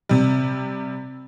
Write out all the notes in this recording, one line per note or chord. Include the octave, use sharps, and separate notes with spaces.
C3 G3